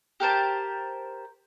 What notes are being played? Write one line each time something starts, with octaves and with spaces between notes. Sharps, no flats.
G4 A#4 C5 A5